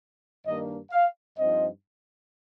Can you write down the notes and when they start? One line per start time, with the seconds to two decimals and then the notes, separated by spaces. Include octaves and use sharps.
0.46 G2 D#3 A#3 D4 D#5
0.91 F5
1.37 G2 F3 C4 D#4 D#5